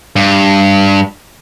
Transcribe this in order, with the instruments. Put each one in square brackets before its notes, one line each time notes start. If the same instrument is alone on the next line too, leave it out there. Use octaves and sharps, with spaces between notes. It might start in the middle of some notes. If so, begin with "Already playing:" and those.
[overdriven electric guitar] G2